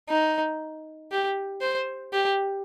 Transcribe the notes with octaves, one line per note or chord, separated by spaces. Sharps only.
D#4
G4
C5
G4